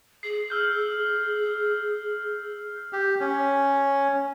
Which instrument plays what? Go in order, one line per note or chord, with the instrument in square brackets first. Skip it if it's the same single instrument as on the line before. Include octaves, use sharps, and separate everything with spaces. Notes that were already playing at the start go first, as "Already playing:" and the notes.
[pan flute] G#4 [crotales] C7
[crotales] E6 F6 G6
[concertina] G4
C#4